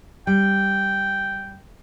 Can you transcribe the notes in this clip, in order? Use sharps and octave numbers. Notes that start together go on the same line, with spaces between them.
G3 G5